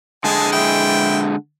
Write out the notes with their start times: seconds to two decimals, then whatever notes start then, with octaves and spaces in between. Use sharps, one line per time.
0.24 D3 G#3 G#4 G#5 A5
0.52 E4 G5